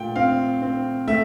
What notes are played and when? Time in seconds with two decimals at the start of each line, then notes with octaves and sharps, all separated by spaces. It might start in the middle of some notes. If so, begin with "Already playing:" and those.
Already playing: A#2 A3 G5
0.16 C4 F5
0.62 C4
1.08 A3 E5